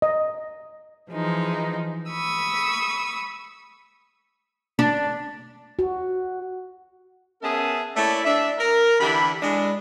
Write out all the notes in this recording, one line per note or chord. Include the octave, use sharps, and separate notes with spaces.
D#5
E3 F3 G#3 D#4
B5 C#6 D#6 E6
D4
F#4
B3 C#4 G#4 A#4 E5 A5
A3 A#3 E4 C#5 D5 A5
D4 E5
A#4
D3 E3 E4 G4 B5
G#3 D4 E4